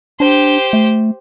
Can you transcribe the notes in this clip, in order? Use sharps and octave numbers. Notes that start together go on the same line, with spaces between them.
D4 G4 C5
A3